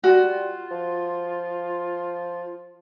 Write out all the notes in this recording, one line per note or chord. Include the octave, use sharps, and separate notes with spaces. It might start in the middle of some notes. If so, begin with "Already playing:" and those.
G3 F4 F#4
F3